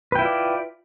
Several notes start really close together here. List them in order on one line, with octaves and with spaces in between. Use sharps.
B4 G5 E4 F4 D5